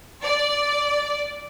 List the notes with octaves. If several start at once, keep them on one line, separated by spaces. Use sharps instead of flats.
D5